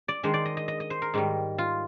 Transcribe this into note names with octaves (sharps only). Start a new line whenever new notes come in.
D5
D#3 G#3 D4 C5
D5
D#5
D#5
D#5
D#5
C5
A#4
G#2 D#3 G3
F4